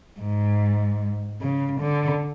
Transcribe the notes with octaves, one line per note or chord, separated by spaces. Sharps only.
G#2
C#3
D3